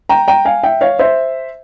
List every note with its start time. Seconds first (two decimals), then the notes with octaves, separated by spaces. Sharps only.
0.09 G5 A#5
0.28 G5 A#5
0.45 F5 G#5
0.63 E5 G5
0.81 C#5 F5
0.99 C5 E5